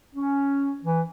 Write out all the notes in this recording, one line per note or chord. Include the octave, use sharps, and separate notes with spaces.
C#4
E3